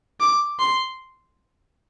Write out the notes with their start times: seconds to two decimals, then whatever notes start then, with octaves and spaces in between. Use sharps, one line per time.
0.20 D6
0.59 C6